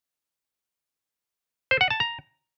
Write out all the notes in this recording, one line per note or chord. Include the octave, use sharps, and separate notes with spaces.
C5
F#5
A5
A#5